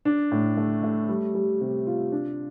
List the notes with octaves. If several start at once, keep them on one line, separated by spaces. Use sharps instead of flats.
D4
A2
A3
A3
G3
G3
C3
F4
D4